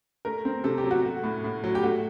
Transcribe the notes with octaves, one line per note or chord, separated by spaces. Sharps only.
A3 A#4
C4
C3 A4
G4
F#3
F#4
A3
A2
A2
F#3
G4
A3 F#4